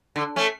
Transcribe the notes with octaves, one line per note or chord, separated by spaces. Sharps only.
D3
A3 C#4